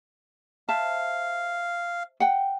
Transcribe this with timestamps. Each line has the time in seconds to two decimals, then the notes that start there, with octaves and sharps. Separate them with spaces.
0.69 C5 E5 F5 A5
2.20 F#5 G5